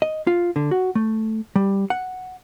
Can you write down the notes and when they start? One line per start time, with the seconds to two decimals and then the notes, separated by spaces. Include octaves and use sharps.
0.02 D#5
0.27 F4
0.56 D3
0.71 F#4
0.95 A3
1.56 G3
1.90 F#5